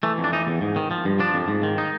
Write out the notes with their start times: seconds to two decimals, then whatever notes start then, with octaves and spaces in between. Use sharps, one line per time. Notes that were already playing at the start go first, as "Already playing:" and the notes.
0.03 E3 A3
0.18 F2
0.24 D4
0.33 E3 D#4
0.47 E2
0.61 G#2
0.76 D#3
0.91 F3
1.05 G2
1.20 F3 D4
1.34 F2
1.48 G#2
1.63 D#3
1.78 D#4